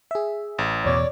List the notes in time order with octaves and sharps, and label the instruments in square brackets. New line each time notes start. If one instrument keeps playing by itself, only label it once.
[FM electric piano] G#4 E5
[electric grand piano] A1
[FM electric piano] E2 B2 [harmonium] C#5 D5